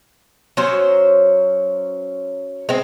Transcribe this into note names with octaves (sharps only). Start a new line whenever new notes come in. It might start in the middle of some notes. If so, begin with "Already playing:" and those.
F#3 C#4 C5
G#3 C4